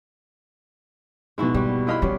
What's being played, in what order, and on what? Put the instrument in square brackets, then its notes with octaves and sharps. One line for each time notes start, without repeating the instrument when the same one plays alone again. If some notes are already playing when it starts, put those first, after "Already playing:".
[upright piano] G#2 B2 [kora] G#3 E4 F#4
[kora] G3 F#4 [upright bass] A#3
[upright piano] E4 D#5 B5 [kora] F4 B4 F5
[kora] F#3 G3 D5 [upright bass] B3 F4 [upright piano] C#4